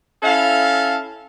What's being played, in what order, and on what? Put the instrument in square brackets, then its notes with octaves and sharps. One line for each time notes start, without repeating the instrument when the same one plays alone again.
[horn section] C#4 E4 A4 E5 F5